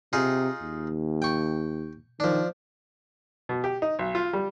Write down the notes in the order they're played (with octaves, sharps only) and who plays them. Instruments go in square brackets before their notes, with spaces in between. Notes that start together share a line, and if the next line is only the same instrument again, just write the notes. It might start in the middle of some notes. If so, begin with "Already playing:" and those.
[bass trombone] C3 [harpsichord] D#4 F4 G#4
[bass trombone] D#2
[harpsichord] G5 C#6
[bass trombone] D#3 [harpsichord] F3 D4
[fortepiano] B2
G4
D#4
B1
F4
G3